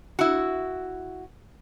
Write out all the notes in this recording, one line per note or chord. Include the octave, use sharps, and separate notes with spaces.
E4 F#4